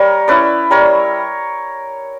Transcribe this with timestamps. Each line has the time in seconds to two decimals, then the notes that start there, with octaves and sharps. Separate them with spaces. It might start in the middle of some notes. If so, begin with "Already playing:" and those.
Already playing: G3 A#4 C#5
0.28 C#4 E4 B4 D5
0.71 G3 A#4 C#5